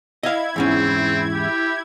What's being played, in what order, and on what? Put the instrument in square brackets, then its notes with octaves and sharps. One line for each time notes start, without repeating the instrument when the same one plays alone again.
[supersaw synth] E4 G#6 [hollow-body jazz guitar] D#5 F5
[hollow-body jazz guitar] E2 G#2 C#4 [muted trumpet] C4
[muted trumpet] G4